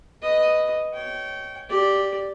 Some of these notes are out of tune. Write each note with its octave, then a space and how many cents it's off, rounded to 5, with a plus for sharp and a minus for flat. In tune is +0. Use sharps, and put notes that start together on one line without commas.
B4 +0 D#5 +0
C#5 +5 G5 -25
G4 +0 D5 +0